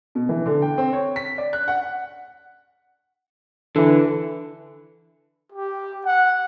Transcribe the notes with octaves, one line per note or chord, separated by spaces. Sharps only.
B2
E3
D3
G5
C4
C#5
B6
D5
F#6
F#5
D3 E3 A4
G4
F#5